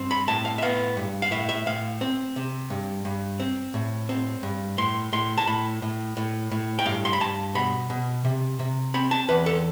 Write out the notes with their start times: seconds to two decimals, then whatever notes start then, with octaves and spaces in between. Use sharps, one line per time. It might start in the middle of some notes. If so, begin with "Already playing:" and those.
Already playing: G2 C4
0.11 B5
0.27 A2 A5
0.45 F5
0.58 E5
0.62 B3 F5
0.97 G2
1.22 F5
1.31 A2 E5
1.49 E5
1.66 A2 F5
2.01 C4
2.36 C3
2.70 G2
3.05 G2
3.40 C4
3.74 A2
4.09 C4
4.43 G2
4.78 A2 C6
5.13 A2 C6
5.38 A5
5.47 A2 B5
5.82 A2
6.17 A2
6.52 A2
6.79 G5
6.86 G2 F5
7.05 C6
7.13 B5
7.20 G2 A5
7.55 B2 B5
7.90 B2
8.25 C3
8.59 C3
8.94 C4 B5
9.11 A5
9.29 E2 B4
9.46 A4